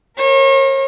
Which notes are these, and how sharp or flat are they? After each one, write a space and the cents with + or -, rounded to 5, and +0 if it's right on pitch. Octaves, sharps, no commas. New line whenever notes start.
A#4 +0 C#5 -40